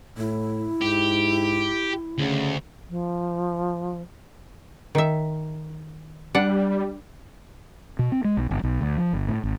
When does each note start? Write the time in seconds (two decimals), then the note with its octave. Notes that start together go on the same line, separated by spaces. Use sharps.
0.18 A2 E4
0.81 G#2 G4
2.18 D2 C#3
2.89 F3
4.95 D#3 E5
6.35 G3 D4 F#5
7.99 B2
8.12 C4
8.24 G#3
8.37 B1
8.51 G1
8.63 B1
8.81 D2
8.98 F3
9.13 G1
9.28 A2
9.44 G#1